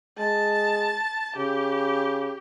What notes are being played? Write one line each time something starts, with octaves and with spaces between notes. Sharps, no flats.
G#3 A5
C#3 G4